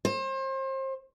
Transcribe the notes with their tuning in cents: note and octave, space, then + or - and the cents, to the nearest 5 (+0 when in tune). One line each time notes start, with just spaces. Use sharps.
C5 +35